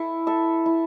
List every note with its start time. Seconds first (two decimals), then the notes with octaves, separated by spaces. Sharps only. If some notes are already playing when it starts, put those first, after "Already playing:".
Already playing: E4 A4
0.27 A4 E5
0.66 E4